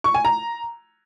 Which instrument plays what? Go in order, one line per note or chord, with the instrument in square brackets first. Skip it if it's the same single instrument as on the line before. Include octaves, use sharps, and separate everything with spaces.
[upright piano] C#6
G#5
A#5